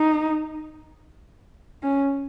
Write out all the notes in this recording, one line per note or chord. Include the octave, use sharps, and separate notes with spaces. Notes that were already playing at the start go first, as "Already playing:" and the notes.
Already playing: D#4
C#4